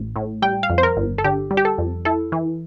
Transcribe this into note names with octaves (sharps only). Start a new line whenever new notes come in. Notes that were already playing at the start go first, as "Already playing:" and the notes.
Already playing: A1
A2
G3 G5
F5
F2
C5
A#4
G1
A4
D3 G4
G3
G4
A4
F2
E4 A4
E3